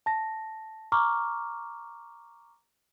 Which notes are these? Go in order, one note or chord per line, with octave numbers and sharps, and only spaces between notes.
A5 A#6
A#5 C#6 D6 F6